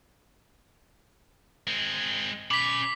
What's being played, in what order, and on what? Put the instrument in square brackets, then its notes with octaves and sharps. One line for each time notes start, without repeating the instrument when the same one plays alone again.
[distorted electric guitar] G#3 C4
[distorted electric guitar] C#4 B5 [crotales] D6 B6